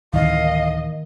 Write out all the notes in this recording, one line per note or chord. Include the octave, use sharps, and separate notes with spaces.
D1 D#3 E3 D#5 F5